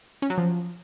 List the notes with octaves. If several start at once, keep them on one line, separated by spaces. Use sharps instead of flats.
C#4
F#3
F3